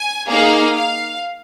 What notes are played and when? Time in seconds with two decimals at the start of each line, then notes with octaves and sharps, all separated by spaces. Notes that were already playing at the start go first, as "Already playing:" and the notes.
Already playing: G#5
0.30 A#3 D#4 G#4 F5
0.76 F5